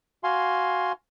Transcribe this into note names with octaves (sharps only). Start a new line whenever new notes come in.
F#4 F5 G#5 C6